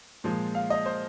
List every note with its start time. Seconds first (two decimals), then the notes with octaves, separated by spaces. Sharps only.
0.24 A#2 F3 G#3
0.55 F5
0.70 D#5
0.86 C5